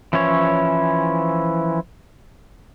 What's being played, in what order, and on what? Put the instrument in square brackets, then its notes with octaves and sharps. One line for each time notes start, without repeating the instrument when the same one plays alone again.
[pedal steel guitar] E3 F3 C#4 E4 C#5